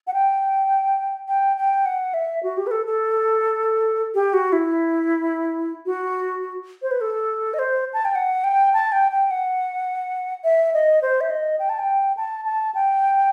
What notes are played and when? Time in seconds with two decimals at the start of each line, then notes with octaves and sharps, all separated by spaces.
0.07 F#5
0.14 G5
1.28 G5
1.57 G5
1.86 F#5
2.14 E5
2.43 F#4
2.57 G4
2.67 B4
2.71 A4
2.86 A4
4.14 G4
4.33 F#4
4.52 E4
5.86 F#4
6.82 C5
6.91 B4
7.01 A4
7.54 D#5
7.59 C5
7.93 A5
8.05 G5
8.15 F#5
8.44 G5
8.74 A5
8.92 G5
9.12 G5
9.31 F#5
10.44 E5
10.74 D#5
11.02 C5
11.21 E5
11.30 D#5
11.59 G5
11.69 A5
11.79 G5
12.17 A5
12.45 A5
12.75 G5